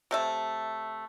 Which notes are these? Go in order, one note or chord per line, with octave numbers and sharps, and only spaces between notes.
C3 A3 E5